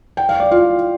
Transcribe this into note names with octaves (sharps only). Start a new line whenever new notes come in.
G5
F5
D5
F4 F5